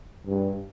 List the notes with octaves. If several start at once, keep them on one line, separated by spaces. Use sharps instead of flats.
G2